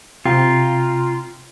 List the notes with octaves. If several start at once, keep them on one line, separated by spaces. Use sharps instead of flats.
C3 F4 G5 A#5